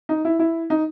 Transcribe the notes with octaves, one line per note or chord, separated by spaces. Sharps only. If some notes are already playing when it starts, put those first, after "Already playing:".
D#4
E4
E4
D#4